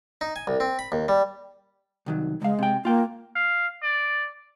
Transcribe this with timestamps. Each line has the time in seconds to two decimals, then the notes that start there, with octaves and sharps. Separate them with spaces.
0.21 D#4
0.36 G#5
0.47 C2
0.60 C4
0.79 B5
0.92 D#2
1.08 G3
2.06 C2 D#3 F#3
2.42 C#2 G#3 F5
2.59 C3 G5
2.85 A#3 F4 G5
3.36 F5
3.83 D5